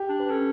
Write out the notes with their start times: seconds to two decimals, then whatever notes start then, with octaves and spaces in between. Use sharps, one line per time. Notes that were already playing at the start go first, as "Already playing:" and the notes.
Already playing: G4
0.09 D4
0.20 B4
0.30 C#4 A4